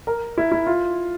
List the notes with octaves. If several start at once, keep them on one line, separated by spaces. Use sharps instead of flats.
A#4
E4
E4
F4